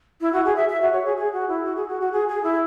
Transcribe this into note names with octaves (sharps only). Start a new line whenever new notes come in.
E4
F#4
G#4
E5
E5
F#4
C#5
G#4
G#4
F#4
E4
F#4
G#4
F#4
F#4
G#4
G#4
E4